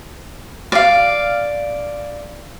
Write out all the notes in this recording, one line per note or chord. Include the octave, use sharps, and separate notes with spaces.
D5 F5